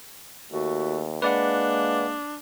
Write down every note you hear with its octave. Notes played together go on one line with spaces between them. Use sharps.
D#2 A3 F#4
G#3 A#3 D4 B4 D5 F#5